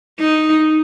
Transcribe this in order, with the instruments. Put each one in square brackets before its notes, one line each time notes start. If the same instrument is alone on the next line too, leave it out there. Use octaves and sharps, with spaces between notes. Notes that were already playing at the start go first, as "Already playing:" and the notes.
[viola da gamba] D#4